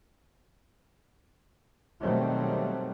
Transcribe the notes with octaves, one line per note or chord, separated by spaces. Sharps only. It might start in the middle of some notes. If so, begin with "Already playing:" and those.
B2 D#3 F#3 G3 A3 C4